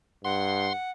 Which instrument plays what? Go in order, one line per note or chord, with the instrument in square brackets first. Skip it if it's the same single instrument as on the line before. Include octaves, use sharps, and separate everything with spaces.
[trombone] G2 [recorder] F#5 [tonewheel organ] C6